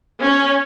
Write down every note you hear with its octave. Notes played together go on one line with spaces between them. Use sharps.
C#4